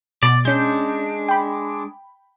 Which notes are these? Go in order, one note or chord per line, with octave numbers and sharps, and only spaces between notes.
B2 D5
G#3 C#4 D4 G6
G5 B5